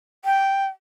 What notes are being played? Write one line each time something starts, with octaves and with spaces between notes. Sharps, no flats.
G5